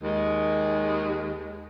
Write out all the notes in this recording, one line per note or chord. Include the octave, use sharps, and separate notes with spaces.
D#2 G#3